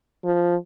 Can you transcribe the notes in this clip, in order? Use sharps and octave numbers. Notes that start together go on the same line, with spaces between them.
F3